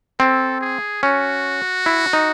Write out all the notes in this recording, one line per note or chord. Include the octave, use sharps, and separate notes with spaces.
C4 A4
G#4
C#4 F#4
E4
D#4